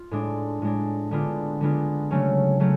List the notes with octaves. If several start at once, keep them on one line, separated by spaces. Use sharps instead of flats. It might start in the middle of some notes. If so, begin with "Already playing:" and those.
Already playing: F4
A2 G#3 D4
A2 G#3 D4
D3 G#3 B3 D4 F4
D3 G#3 B3 D4 F4
C#3 F#3 A3 C#4
C#3 F#3 A3 C#4